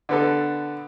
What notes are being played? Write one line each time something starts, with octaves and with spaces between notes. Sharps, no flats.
D3 B3 A4